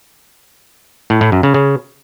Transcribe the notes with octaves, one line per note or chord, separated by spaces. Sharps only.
A2
A2
F#2
C#3
C#3